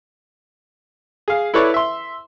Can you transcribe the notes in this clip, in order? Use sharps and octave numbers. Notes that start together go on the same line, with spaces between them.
G#4 F5
E4 A4 B4 C#5 D5
E5 C6